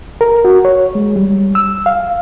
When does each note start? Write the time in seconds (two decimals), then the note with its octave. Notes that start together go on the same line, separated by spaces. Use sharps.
0.21 A#4
0.45 F#4
0.65 C#5
0.95 G#3
1.16 G3
1.55 E6
1.86 F5